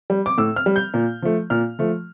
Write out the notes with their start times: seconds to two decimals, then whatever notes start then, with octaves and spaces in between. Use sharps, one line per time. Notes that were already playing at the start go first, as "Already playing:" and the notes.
0.10 G3
0.26 D6
0.38 A2 E6
0.56 F6
0.66 G3
0.76 G6
0.94 A#2
1.22 F3 A3
1.50 A#2 F6
1.79 F3 A3